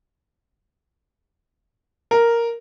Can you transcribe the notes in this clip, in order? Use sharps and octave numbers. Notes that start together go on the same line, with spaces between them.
A#4